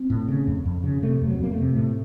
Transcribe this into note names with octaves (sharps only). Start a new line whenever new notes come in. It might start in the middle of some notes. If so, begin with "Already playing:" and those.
Already playing: C4
A2
C#3
F2
F2
C#3
C3 A3
F2
F#3
F2 A#3
A3
C3
A2 A3